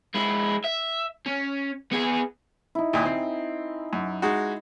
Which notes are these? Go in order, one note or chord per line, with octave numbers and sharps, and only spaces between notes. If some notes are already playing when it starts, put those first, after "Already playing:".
G#3 E4
E5
C#4
B3 G#4
D#4 E4
D#2 A#2 G#5 D#6
C4
F#2
G#3 D#4 F#4